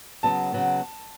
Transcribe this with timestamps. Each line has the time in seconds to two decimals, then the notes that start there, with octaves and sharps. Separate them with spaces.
0.23 C#3 F#3 B3 A5
0.52 C#3 F#3 B3